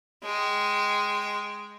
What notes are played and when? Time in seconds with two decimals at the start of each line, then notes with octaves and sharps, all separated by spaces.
0.24 G#3 G5